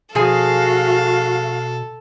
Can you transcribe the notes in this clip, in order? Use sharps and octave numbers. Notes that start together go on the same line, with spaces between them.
B2 F3 F#4 G#4 A4 F5 G#5